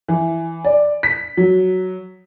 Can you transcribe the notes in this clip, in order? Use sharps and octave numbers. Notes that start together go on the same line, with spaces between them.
E3
D5
B6
F#3